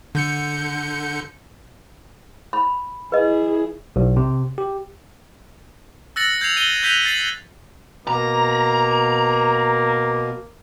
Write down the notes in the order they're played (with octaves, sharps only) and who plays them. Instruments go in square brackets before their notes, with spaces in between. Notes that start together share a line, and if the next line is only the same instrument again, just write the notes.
[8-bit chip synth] D3 G6 C#7
[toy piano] B5
[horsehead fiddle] E4 G#4 [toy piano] B4 D#5
[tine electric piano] B1
C3
G4
[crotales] E6 F#6 A6 A#6 C#7 F#7
G6 G#6 C7 F7
D#7 F#7 G7
F#6 G6 B6 D#7 F7
A6 C7 F#7
[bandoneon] B2 [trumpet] A#3 [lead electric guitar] A#5